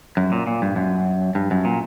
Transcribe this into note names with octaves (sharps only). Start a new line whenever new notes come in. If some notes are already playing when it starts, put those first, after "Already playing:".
F#2
A#2
A#2
G2
F#2
G2
F#2
A#2